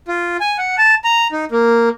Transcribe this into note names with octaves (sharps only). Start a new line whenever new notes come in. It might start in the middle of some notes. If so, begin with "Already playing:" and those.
F4
G#5
F#5
A5
A#5
D#4
A#3